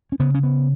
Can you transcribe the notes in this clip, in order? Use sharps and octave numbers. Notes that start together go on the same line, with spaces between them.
C#4
C#3 B3
C#4
B3